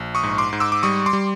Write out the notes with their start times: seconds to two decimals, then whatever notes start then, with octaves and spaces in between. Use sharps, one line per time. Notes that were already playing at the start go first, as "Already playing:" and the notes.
Already playing: A#1
0.15 C#6 D#6
0.23 G#2
0.38 C6 D6
0.53 G#2
0.60 D6 E6
0.72 D6
0.83 G3 C#6 D#6
1.06 C6 D6
1.13 G3